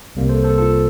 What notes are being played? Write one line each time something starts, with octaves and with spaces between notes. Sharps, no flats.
C2 C3 G3 A#3
A4 C5
A4 C5
F4 A4